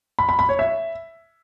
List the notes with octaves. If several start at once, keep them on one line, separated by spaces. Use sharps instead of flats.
B5
B5
B5
C#5
E5